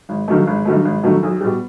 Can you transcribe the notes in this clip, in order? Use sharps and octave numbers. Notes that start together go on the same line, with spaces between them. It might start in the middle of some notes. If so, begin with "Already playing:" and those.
G#1
G2 D#3 F#3 A3
G#1
G2 D#3 F#3 A3
G#1
G2 D#3 F#3 A3
B1
B2 G3